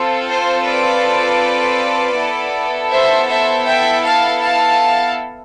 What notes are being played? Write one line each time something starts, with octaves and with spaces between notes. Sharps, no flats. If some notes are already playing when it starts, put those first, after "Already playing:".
Already playing: C4 F4 A4
C5
B4 D5
B3 E4 A4
C5 E5
C5 E5
E5 G5
F5 A5
F5 A5